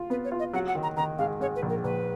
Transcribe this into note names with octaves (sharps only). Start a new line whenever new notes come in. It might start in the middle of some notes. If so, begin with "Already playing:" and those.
Already playing: F4
B3 B4
C#5
F4
D#5
F#3 F#5
F#5
D#3
A#5
D#3 A#5
G#2 F5
G#2 C#5
B4
A#1
A#4
A#1 B4